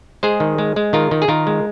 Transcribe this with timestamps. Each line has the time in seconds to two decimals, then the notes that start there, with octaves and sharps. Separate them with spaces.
0.23 G#3 G#4 C5
0.40 D#3
0.58 G#3
0.76 G#3
0.93 D#3 F4 A#4
1.11 D#3
1.22 G#4
1.28 D#3 F4 A#4
1.47 G#3